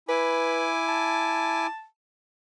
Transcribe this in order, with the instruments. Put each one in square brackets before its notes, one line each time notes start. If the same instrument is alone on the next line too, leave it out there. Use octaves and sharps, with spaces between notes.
[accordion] E4 G#5 D6 [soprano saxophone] B4
[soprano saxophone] A5